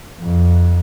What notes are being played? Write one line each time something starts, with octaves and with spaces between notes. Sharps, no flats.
F2